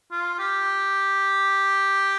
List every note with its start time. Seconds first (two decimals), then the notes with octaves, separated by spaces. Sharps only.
0.11 F4
0.39 G4